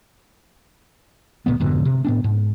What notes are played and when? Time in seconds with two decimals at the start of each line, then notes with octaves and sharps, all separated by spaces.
1.46 D2 A#2 C#3 B3
1.60 F2 G#2 B2 D3
1.85 C3
2.05 A2 B3 D4
2.24 G#2